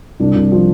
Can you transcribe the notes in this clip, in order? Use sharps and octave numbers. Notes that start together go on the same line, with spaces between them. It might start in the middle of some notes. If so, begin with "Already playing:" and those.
C2 D4
C2
F3